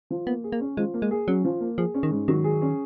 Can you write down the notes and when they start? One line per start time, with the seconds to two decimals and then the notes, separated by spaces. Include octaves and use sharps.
0.10 F3
0.27 A#3 B3
0.44 G#4
0.52 A#3
0.60 C#4
0.77 F3 G#3
0.94 A#3
1.02 G#3
1.11 G#4
1.28 F#3 C#4
1.44 F3
1.61 A#3
1.78 F3 G#4
1.94 C#4
2.03 D#3
2.11 G#2
2.28 D#3 F#3
2.44 G#4
2.62 C#4